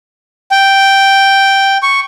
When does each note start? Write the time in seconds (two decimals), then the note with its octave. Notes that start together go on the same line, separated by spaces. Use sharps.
0.51 G5
1.83 C#6